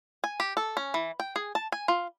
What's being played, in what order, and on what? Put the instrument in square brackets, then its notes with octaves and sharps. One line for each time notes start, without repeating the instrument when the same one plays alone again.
[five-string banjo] G#5
G4
A4
C#4
E3
G5
G#4
A5
G#5
F4